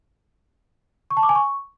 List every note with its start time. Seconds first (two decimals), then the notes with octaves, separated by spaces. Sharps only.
1.11 C#6
1.17 A5
1.23 D6
1.29 G#5
1.35 C#6